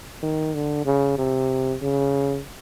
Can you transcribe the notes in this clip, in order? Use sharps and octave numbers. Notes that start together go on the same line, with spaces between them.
D#3
D3
C#3
C3
C#3